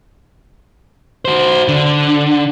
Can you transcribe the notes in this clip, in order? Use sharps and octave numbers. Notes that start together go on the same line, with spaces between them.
F#4 C5
D3